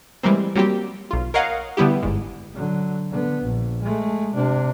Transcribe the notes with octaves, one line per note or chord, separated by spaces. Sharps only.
E3 G3 G#3 A#3 C4
F#3 G3 A#3 C4 G4
B1 F4
A#4 C#5 D#5 F5 F#5
D3 G3 B3 E4 G4
G1 G#2
D3 F#3
D3 B3
A#1
G#3 A3
C3 D4